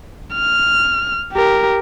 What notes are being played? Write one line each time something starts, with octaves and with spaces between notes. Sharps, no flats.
F6
G4 A#4